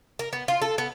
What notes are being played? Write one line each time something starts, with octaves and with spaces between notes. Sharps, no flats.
A#4
B3
F4
A4
B3